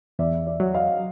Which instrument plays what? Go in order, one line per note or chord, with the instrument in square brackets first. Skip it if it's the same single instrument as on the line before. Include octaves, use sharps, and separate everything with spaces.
[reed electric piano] E2 [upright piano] D5 E5
[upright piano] D5 E5
[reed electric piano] F#3
[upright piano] D#5 F5